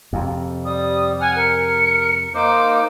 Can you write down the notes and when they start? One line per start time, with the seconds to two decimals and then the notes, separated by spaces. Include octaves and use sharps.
0.13 F2 C3
0.65 G3 D#6
1.21 F#5 G#5 F6
1.36 A#4 C#7
2.35 A#3 D#4 C5 D6